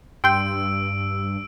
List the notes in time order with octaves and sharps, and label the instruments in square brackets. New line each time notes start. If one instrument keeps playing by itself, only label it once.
[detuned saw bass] G2 [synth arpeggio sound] G5 C6 G6 [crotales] E6 D7